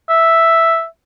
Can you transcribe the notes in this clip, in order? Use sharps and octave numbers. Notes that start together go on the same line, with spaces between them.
E5